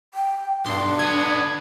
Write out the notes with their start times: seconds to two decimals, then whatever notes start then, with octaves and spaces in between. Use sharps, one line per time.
0.14 G5
0.66 B1 G2 D4 C6
0.99 D3 B3 G#6